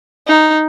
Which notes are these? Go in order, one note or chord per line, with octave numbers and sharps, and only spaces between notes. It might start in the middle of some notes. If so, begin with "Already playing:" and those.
D#4